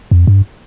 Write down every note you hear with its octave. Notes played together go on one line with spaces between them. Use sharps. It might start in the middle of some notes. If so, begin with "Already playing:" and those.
F2
G2